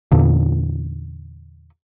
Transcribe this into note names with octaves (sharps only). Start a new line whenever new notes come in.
E2 A#2 D3